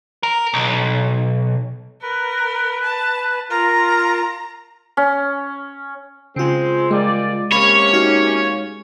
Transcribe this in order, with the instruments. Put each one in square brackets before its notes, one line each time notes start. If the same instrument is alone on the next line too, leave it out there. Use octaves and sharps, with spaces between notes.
[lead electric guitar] A#4
B1
[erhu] A#4 [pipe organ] B4
[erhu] A5
[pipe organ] F4 A#4 [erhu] A#5
[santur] C#4
[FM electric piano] C#3 F4 [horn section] G#3 C4 C5
[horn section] A#2 G3 D5 [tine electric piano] G#3
[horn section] C3 A#3 C#4 [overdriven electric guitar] C#5 [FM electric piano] B5
[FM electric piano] D#4 F#4